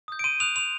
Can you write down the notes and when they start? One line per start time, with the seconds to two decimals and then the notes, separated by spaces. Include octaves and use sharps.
0.08 D#6 G6
0.19 D7
0.24 C6 D#7
0.40 D#6 F#6 F7
0.56 C6 F7